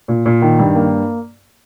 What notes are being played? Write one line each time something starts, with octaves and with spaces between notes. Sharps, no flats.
A#2
A#2
D#3
G2
A#3